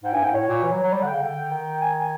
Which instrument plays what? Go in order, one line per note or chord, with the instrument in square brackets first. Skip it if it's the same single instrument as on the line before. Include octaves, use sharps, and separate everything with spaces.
[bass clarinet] G#2 [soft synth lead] G5
[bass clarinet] G2 [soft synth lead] G#5
[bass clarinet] G#2 [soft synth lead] G5
[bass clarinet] A2 [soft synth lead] C#5
[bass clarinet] A#2
E3
F#3
F#3
[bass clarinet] G3 [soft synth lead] D5
[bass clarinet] D3 [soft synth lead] F#5 G5
[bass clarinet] C#3
[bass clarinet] D3 [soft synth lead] G5
[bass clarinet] D3
D#3
[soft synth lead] G#5
G#5